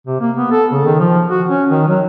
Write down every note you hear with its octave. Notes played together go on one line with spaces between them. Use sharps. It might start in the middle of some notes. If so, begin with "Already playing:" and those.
C3
A#3
B3
A4
C#3
D#3
F3
F#4
C#4
D#3
F#3